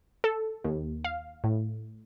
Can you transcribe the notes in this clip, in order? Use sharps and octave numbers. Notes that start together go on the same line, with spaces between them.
A4
D#2
F5
A2